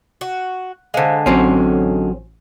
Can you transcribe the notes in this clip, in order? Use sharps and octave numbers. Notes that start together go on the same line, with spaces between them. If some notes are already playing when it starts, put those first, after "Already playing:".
F#4
D3 G#3 C5 F5
A1 F#3 C4 C#4